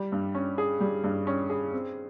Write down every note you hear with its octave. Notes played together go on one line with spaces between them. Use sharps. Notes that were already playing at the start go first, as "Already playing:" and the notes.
Already playing: G3
G2
C#4
G#4
G3
G2
C#4
G#4
C4